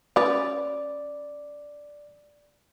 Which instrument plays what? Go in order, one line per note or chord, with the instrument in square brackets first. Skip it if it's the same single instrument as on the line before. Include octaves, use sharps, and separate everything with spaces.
[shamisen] C#4 B4 [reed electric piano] D5